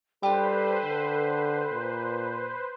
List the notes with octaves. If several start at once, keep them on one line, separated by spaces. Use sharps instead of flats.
G3 D4 F4 G4 A4 B4 C5
D3
A#2